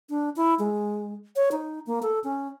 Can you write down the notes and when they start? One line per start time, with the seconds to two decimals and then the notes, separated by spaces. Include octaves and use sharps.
0.09 D4
0.36 E4
0.59 G#3
1.36 C#5
1.51 D#4
1.86 A#3
2.02 A4
2.24 C#4